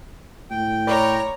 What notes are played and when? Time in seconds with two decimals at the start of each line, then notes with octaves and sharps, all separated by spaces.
0.51 A2 G5
0.87 A#4 C#5 D5 A#5 B5